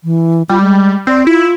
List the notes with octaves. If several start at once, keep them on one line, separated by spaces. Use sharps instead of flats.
E3
G3 F4
G#3
C4 D5
E4 F4